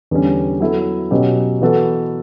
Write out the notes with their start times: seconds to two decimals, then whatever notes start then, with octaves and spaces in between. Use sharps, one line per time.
0.11 E2 D3 G3 C#4
0.60 F#3 B3 E4 A4
1.11 B2 F#3 C#4 G4
1.61 E3 B3 F#4 A4